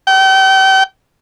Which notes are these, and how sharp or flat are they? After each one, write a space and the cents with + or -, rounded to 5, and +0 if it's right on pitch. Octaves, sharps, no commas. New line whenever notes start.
G5 -35